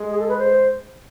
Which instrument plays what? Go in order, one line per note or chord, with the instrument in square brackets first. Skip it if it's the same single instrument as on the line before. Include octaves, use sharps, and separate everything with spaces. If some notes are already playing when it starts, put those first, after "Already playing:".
Already playing: [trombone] G#3
[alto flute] G#4
A4
B4
C5